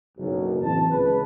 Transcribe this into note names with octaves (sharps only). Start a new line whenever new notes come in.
F#1 B1
A2 E3 C4 A5
C#2 B4